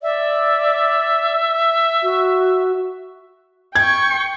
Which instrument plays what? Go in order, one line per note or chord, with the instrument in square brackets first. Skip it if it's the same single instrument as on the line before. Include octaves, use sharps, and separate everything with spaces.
[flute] D5 [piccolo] E5
[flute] F#4
[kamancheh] G5 C#6 [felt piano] G#6